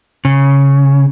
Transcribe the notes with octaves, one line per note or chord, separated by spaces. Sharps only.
C#3